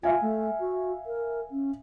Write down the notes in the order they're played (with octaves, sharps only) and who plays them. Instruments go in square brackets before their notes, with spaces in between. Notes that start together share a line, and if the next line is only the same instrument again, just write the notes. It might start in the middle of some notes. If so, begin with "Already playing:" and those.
[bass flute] F4 [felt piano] E5 F5 G#5
[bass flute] A3
F#4
A#4
C#4